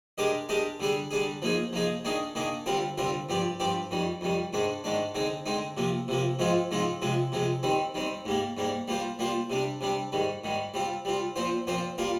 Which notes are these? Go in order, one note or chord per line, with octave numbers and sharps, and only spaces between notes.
G#3 D4 G4 A#4 D#5
G#3 D4 G4 A#4 D#5
D3 G3 D4 G#4
D3 G3 D4 G#4
F3 A#3 D#4 G#4
F3 A#3 D#4 G#4
D#3 A#3 D4 G#4 D#5
D#3 A#3 D4 G#4 D#5
D3 G3 C4 F4 A#4
D3 G3 C4 F4 A#4
G2 F3 C4 G4 D5
G2 F3 C4 G4 D5
F2 D#3 G3
F2 D#3 G3
G#2 D#3 G#3 D4
G#2 D#3 G#3 D4
D3 G#3 C4 D#4
D3 G#3 C4 D#4
C3 F3 A#3
C3 F3 A#3
G#2 F3 G#3 C4 F4
G#2 F3 G#3 C4 F4
C3 F3 G#3
C3 F3 G#3
D#3 G3 C4
D#3 G3 C4
G#2 G3 A#3
G#2 G3 A#3
G3 A#3 F4 C5
G3 A#3 F4 C5
C3 G3 D4
C3 G3 D4
G#2 D#3 G3
G#2 D#3 G3
G3 C4 F4
G3 C4 F4
A#2 F3 C4 F4 C5
A#2 F3 C4 F4 C5
G3 A#3 F4 A#4